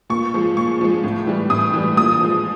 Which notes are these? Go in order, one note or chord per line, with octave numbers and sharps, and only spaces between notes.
A#2 C#6
F3 G#3
A#2 C#6
F3 G#3
A2
E3 G3
A2 D#6
E3 G3
A#2 D#6
F3 G#3